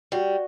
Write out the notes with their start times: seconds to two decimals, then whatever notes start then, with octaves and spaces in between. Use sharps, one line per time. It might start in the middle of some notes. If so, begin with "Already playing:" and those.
0.12 G3 F#4